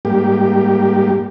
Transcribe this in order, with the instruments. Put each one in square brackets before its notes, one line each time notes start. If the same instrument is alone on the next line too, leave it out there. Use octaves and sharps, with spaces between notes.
[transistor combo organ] G#2 G3 A#3 G4